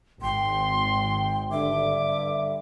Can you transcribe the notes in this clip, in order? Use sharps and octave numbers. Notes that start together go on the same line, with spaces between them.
G#1 G5 C6
G2 D3 E5 D6